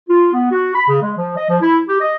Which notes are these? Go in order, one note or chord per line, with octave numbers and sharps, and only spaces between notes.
F4
B3
F#4
B5
C#3
G#3
F3
D#5
F3
E4
G4
D#5